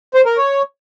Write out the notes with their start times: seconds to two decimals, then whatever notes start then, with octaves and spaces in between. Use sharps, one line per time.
0.14 C5
0.26 A#4
0.37 C#5